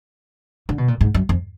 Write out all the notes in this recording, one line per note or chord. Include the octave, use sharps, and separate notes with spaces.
D3
B2
A#2
G#2
F#2
F2